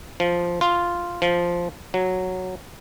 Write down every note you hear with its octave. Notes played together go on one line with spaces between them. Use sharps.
F3
F4
F3
F#3